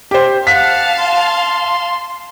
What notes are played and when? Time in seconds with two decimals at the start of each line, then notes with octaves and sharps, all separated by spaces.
0.11 G4 C5
0.47 F5 F#5 A5 B6
0.98 C6